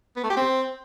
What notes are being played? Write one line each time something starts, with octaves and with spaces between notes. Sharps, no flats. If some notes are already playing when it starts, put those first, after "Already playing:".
B3
A3
G4
C4